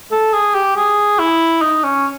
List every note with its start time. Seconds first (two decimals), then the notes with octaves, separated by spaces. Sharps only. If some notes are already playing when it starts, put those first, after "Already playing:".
0.12 A4
0.34 G#4
0.54 G4
0.76 G#4
1.19 E4
1.62 D#4
1.84 C#4